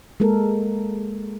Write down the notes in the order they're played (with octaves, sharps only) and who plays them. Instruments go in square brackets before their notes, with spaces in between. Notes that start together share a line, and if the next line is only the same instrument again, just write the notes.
[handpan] G#3 A#3 A4 A#4